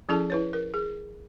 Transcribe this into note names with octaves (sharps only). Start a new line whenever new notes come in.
F3 C#4 E4 G#4 A4 A5
E4 B4 C#5
A#4
G#4